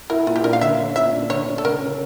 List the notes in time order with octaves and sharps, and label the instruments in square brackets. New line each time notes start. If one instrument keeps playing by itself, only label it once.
[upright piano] E4 [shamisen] A#4
[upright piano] A#2 [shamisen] F4
[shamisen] G4
[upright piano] D4 [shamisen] A#4
[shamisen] F5
[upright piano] D3 [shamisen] E5
[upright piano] C#4
[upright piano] A#2 [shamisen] E5
[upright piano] D4
[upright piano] D3 [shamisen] C#5
[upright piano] D4
[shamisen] A4
[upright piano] C#3 [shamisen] A#4
[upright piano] C#4